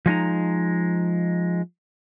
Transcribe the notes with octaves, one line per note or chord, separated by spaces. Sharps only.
F3 G#3 D#4 A#5